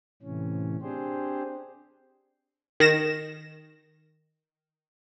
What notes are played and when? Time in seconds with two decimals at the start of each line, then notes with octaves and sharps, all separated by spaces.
0.22 A2 C3 E3 C#4
0.82 C4 D4 G4 G#4 C5
2.80 D#3 A#6 E7